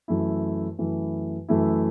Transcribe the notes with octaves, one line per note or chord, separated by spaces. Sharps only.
F#2 E3 A3 E4
F#2 E3 A3 E4
F#2 E3 A3 E4